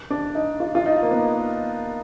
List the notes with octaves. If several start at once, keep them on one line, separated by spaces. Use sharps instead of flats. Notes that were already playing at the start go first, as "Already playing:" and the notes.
D4
D#4
F4
F4
D#4
A#3
B3